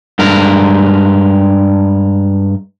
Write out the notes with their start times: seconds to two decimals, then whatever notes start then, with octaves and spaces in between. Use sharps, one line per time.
0.19 G2 G#3 A#4